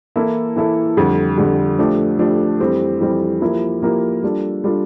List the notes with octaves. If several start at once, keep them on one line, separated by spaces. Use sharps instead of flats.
E3 A#3 E4 A4
E3 A#3 E4 A4
F2 D3 G3
F2 D3 G3
F3 A3 D4 G4
F3 A3 D4 G4
F2 E3 G3 C4 G4
F2 E3 G3 C4 G4
F3 A#3 E4 G4 A#4
F3 A#3 E4 G4 A#4
G3 D4 F4 A4
G3 D4 F4 A4